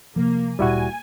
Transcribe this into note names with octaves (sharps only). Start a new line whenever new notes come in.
C3 F3 A#3
D1 A#2 G3 E4 F#4 G#5